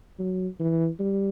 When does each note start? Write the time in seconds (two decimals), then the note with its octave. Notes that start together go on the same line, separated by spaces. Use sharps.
0.19 F#3
0.60 E3
0.99 G3